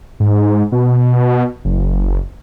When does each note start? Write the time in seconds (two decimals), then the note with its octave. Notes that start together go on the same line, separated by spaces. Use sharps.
0.20 G#2
0.72 B2
1.65 F#1